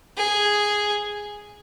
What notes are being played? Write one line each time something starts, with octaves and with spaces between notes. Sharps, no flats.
G#4